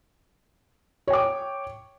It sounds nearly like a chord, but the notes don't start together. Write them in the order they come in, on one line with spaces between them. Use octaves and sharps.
C#5 G5 D6